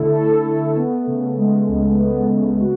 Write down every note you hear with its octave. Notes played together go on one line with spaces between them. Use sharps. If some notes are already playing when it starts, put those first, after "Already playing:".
Already playing: D3 A3 E4 A4
A4
A3
B3
C#3
G#3
C#2
B3
C#3
F#4